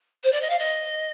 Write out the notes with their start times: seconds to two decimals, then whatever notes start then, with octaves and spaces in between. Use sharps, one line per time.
0.23 C5
0.32 D5
0.41 D#5
0.50 F5
0.58 D#5